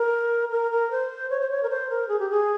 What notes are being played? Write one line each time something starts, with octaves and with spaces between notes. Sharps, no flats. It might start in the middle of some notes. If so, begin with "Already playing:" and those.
Already playing: A#4
A#4
A#4
C5
C#5
C5
C#5
A#4
C5
A#4
G#4
G4
G#4